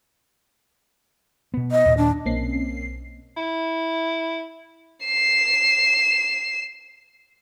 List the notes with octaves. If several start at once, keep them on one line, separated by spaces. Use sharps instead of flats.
B2 B3
D#5
D#2 A#2
D4
B1 A#3 C4 C#4 C7
E4
C7 E7